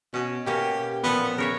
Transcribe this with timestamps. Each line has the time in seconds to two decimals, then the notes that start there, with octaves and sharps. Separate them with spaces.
0.14 B2 C#4
0.46 B2 A#3 C#4 G4
1.04 A#2 F3 B3 A4
1.38 C#3 A#4 C#5 E5